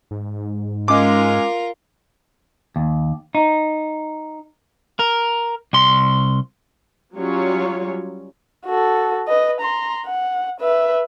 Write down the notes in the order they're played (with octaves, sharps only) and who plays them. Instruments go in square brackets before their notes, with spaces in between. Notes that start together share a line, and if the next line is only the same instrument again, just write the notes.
[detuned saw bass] G#2
[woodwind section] G#3 C#4 [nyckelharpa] F4 A#4 [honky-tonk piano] D6
[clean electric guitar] D#2
D#4
A#4
C2 C6
[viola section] F#3 G3 C#4 F4 C#5
[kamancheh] F#4 A4
B4 D#5
A#5 C6
F#5
B4 E5